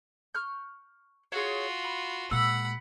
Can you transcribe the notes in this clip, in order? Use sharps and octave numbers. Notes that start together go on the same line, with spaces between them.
C#6 F6 G6
F4 F#4 G#4 C#5
B5
A#2 G#3 F#5 B5 E6